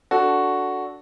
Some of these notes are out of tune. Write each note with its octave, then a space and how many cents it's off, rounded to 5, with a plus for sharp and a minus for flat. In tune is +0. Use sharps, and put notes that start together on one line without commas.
D4 -15 F#4 +0 A4 +0